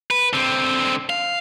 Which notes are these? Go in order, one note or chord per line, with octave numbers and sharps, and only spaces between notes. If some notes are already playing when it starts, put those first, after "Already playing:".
B4
D3 C4
F5